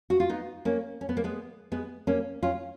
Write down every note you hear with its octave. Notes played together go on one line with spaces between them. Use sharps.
F#4
F4
B3 D#4
A#3 C#4
C#4
B3
A#3
G#3 B3
G#3 B3
A#3 C#4
C#4 F4